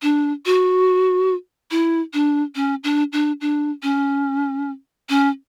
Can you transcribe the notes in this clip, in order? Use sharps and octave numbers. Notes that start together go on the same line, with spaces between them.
D4
F#4
E4
D4
C#4
D4
D4
D4
C#4
C#4